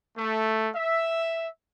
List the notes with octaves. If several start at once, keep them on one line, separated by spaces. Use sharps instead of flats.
A3
E5